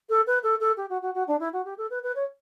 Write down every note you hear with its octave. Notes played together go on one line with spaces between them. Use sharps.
A4
B4
A4
A4
G4
F#4
F#4
F#4
D4
E4
F#4
G4
A4
B4
B4
C#5